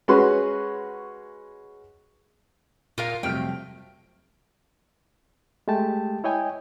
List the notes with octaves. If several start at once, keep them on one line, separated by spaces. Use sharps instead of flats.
G#3 C#4 F#4 B4 C6
A#2 F4 A#4 F5
F2 C3 F#3 G3 A3 G5 F6
G#3 A3 G4 G5 A5
E4 C#5 D#5 G5 G#5